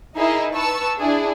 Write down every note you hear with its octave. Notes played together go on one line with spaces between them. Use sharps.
D#4 E4 G#4 A#4 D#5 E5
B4 A5 C#6 E6
D4 E4 G#4